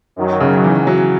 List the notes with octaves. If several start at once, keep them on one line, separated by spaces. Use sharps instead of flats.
F#2 D#3 F#3
C#3
E3
F#3